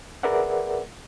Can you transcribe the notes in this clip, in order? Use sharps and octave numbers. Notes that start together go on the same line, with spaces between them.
G#4 A#4 B4 D5 E5 F#5